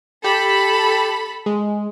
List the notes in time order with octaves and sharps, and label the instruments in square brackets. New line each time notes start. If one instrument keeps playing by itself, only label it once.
[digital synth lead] G4 [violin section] A4 B5
[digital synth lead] G#3